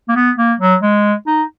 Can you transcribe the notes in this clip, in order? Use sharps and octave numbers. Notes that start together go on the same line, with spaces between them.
A#3
B3
A#3
F#3
G#3
D#4